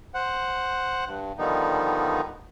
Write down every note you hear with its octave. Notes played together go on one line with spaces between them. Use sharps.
C5 F#5
G2
D3 D#3 F3 G3 B3 D#4